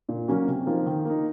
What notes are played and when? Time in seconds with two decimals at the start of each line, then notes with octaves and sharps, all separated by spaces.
0.09 A#2
0.28 F#3 A#3 C#4 F#4
0.48 C3
0.66 F3 A#3 D#4
0.86 D#3
1.05 A#3 D#4